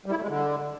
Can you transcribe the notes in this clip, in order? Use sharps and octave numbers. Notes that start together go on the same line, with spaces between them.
G3
E4
A3
G#3
D3